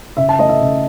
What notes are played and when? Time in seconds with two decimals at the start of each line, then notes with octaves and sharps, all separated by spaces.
0.17 C#3 E5
0.29 A5
0.39 A3 D#5
0.49 E5
0.61 C#3